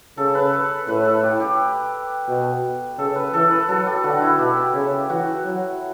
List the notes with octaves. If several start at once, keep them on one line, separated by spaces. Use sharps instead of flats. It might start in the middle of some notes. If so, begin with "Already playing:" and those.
C#3 A4
B4
A4
A2 B4
A4
G4
G4
B2
C#3 A4
B4
E3 A4
B4
F#3 A4
G4
D3 F#4
E4
B2 G4
C#3
E3 F#4
F#3